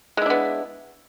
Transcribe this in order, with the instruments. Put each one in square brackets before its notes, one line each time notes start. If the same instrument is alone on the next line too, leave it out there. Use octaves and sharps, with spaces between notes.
[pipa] G#3
E4
D4
B3